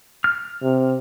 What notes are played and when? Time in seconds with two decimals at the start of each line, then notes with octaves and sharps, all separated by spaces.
0.24 F6
0.62 C3